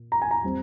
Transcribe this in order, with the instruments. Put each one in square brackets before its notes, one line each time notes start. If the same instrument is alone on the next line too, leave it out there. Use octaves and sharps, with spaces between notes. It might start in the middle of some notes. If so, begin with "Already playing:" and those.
Already playing: [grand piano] A#2
A#5
G#5
A#5
G3 C4